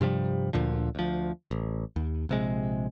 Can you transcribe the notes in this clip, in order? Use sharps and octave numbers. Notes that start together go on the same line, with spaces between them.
G2 C3 F3 G3
D2 A#2 D3 F3
D2 F3
A1
D#2
A#1 C3 G#3